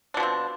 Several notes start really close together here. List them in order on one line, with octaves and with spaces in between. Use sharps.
D4 B2 F3 C4